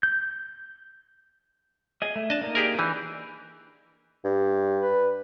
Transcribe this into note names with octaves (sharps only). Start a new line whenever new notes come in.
G6
G#4 D#5
A3
D4 D#5 A5
A#3 D#4
G4 G#4 A#4
E3 D4 G#5 G6
G2
B4